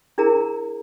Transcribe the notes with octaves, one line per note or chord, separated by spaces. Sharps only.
D4 E4 G#4 A#4 A#5